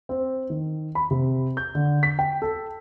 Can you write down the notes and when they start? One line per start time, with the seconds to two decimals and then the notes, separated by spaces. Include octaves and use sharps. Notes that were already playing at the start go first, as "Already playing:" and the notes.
0.09 C4
0.50 D#3
0.95 B5
1.11 C3
1.57 G6
1.75 D3
2.03 B6
2.19 G5
2.42 A4